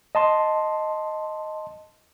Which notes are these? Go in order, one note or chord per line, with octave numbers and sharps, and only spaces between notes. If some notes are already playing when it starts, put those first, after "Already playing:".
D#5 A5 C6